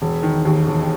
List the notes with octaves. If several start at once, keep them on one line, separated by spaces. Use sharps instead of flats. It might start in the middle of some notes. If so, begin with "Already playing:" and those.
E1
D#3
D#2
E1